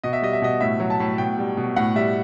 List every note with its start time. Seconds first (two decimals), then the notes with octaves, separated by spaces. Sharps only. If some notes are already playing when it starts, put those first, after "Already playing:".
0.04 B2 D#5
0.13 E5
0.22 G3 D#5
0.33 E5
0.42 B2 D#5
0.60 A2 E5
0.80 F#3
0.90 A5
1.00 A2
1.18 B2 G5
1.38 G3
1.57 B2
1.76 A2 F#5
1.95 G3 E5